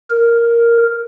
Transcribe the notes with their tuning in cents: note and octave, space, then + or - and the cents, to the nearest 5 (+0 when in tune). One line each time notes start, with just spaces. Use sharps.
A#4 +0